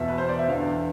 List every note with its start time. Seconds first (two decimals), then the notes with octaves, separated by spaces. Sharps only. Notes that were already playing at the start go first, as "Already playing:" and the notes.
Already playing: E2 B2 E5
0.08 B4
0.18 C5
0.29 D5
0.39 E5
0.48 E2 D3 F5